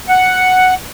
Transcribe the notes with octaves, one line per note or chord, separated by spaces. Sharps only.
F#5